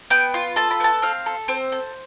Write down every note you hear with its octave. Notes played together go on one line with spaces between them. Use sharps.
B3 G5
F4
A4 A5
B5
B3 A5
C4 F5
A4
C4 C5
A4